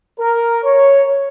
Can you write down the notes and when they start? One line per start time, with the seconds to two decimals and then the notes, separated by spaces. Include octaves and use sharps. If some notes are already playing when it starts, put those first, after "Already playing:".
0.18 A#4
0.62 C#5